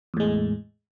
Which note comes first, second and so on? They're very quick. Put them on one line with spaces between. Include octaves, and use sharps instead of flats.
E2 A2 G#3